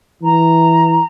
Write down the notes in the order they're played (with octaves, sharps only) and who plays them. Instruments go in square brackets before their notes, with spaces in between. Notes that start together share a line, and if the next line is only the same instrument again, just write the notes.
[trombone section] E3 [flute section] A#5